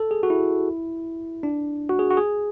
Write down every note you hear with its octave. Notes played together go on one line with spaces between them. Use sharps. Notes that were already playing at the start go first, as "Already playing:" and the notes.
Already playing: A4
G#4
F#4
E4
D4
F#4
G#4
F#4
G#4